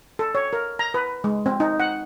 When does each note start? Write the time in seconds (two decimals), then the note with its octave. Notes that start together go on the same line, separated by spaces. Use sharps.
0.19 A4
0.35 C#5
0.53 A#4
0.79 A#5
0.94 B4
1.24 G#3
1.46 C4
1.60 D#4
1.80 F#5